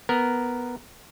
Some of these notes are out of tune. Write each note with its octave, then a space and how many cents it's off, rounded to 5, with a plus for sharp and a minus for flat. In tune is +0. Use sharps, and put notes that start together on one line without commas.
B3 +0 A#4 +0